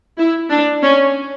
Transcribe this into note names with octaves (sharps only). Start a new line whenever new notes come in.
E4
D4
C#4